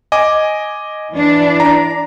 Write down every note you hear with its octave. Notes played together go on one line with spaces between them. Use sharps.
D#5 G#5 D6
E3 D4
A#5